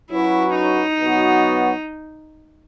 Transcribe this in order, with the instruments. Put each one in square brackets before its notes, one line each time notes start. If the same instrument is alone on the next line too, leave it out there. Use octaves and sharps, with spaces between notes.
[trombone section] F#3 C#4 F#4 B4 [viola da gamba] E4
[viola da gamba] D#4
[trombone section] B2 F#3 B3 F#4